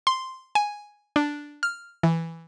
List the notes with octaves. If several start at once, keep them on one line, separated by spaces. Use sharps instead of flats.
C6
G#5
D4
F6
E3